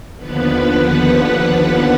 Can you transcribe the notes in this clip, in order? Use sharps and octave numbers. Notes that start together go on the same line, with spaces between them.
D#2 D3 F3 B3 B4
F#5